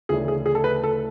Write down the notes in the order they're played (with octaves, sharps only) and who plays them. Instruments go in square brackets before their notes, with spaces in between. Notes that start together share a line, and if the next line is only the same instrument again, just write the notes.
[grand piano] D2 C#3 E3 A3 D4 G#4
G#4
G#4
A4
B4
A4